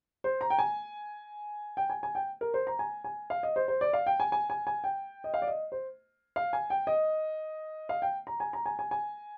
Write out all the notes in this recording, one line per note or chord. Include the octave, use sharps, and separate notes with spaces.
C5
A#5
G5
G#5
G5
G#5
G#5
G5
A#4
C5
A#5
G#5
G#5
F5
D#5
C5
C5
D5
F5
G5
G#5
G#5
G#5
G#5
G5
D#5
F5
D5
D#5
C5
F5
G#5
G5
D#5
F5
G5
A#5
G#5
A#5
G#5
G#5
G#5